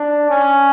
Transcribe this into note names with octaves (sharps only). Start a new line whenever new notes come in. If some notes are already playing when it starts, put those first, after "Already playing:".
Already playing: D4
C#4